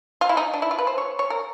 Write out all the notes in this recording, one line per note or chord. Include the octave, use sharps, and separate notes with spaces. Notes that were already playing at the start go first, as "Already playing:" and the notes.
F4
E4
D#4
D4
E4
F4
B4
C5
C#5
C#5
A#4